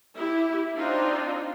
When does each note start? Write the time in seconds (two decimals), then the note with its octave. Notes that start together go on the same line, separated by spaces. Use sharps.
0.15 E4 G4
0.76 C4 D4 D#4 F4